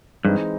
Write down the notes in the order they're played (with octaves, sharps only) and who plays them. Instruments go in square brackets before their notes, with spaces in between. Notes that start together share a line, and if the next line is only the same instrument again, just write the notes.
[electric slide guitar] G2 [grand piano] E3 G#3 C4 D#4